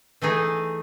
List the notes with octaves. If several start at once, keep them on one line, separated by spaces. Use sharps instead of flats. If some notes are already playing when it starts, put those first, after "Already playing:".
E3 A3 D#4 G#4